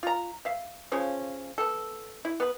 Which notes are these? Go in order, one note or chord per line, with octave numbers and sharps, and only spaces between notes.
F4 A#5
E5 F5
C#3 F3 C#4
B3 A4
E4
B3 B4